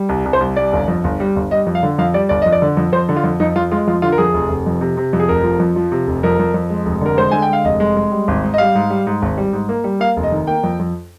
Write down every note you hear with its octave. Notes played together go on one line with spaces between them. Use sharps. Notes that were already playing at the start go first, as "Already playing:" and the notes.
Already playing: G3
C2
C2
C5
C2
G3 D5
G1
F2
G1
G3
G1
G3 D#5
F2
F5
D3
F2 F5
G3 D5
G1 D5
F2 D#5
D5
D3
F2
F2 C5
D3
F4
F2
F2 D#4
F2 F4
G#3 F4
F2 F4
D3 F4
A#4
F2 G#4
F1
F1
F2
C3
C3
F2
G#4
F1 A#4
F3
F2
F3
C3
F1
F2 A#4
F2
F2
G#3
F1
D3 A#4
G#3 C5
D3 G#5
G5
G#3 F5
F1 D#5
G#3
G#3
G3
G#1
G#2
D#5
G3 F5
G#2
G3
G#2
G#1
G3
G#2
A#3
G3
A#3 F5
F1
D#5
D#3
A#3 G5
F2
F2